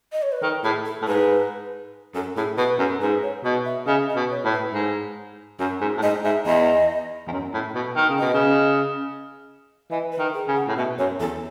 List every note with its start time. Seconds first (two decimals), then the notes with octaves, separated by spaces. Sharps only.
0.12 D#5
0.22 C#5
0.32 B4
0.42 D#3 A4
0.64 A2 G#4
0.85 A4
1.02 A2
1.07 G#2 B4
2.15 F#2 A4
2.37 A2 G#4
2.58 B2 B4
2.79 F#2 A4
3.01 G#2 B4
3.23 C#5
3.44 B2 D#5
3.65 E5
3.87 C#3 D#5
4.09 D#5
4.16 B2
4.31 C#5
4.45 A2
4.52 B4
4.73 G#2 G#4
5.59 F#2 F#4
5.81 G#2
5.97 A2
6.02 G#2 D#5
6.24 G#2 E5
6.46 E2 D#5
7.28 E2
7.32 F#2
7.54 A2
7.75 B2
7.96 D#3
8.09 C#3
8.19 B2 D#5
8.34 C#3
9.91 E3 D#5
10.12 B4
10.19 D#3
10.34 G#4
10.48 C#3
10.56 F#5
10.68 A2
10.77 B2 E5
10.98 F#2 C#5
11.20 E2 A4